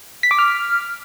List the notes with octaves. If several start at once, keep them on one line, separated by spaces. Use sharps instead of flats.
B6
D6
F6